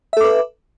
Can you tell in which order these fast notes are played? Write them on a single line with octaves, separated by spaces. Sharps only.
E5 A4 D6 B4